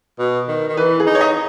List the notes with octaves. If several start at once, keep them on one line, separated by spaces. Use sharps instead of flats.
B2
D#3
D#3
E3 B4
G#4
D#4
C#5
D#5